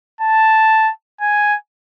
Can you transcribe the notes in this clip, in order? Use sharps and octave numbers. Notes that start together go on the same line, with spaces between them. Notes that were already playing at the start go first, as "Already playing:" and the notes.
A5
G#5